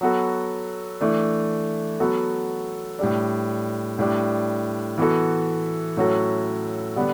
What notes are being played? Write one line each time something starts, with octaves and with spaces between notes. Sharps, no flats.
F#3 B3 F#4 A4
E3 A3 D4
F#3 B3 F#4 A4
A2 G3 D4
A2 G3 D4
E3 B3 F#4 A4
A2 F#3 C#4 F#4 A4
D3 G3 B3 D4